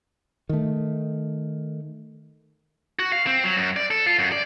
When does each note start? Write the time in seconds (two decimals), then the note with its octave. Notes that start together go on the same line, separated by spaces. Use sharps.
0.49 D#3 A3
2.99 F#4
3.12 F5
3.27 C4
3.44 F#3
3.57 F#2
3.76 D5
3.91 A4
4.06 F4
4.19 F#2
4.32 D5